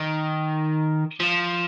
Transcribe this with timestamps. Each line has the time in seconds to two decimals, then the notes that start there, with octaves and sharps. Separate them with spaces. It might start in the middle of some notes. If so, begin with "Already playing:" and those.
Already playing: D#3
1.20 F3